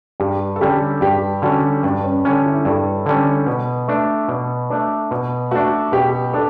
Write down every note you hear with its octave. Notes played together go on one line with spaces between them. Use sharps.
G2 G4
A4
D3 G3 C#4 G4
G2 G4
D3 G3 C#4 F#4
G2 D4
C#4
D3 G3 C#4 D4
E4
G2 A4
D3 G3 C#4
B2
A3 D4
B2
A3 D4
B2
A3 D4 F#4
B2 G4
D4 A4